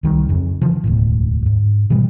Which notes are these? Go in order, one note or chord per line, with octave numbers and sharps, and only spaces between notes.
C2 D#3 G3
F2 C#3
C#3 E3 F3
E1 D2 A2
G#2
B2 E3 G3 G#3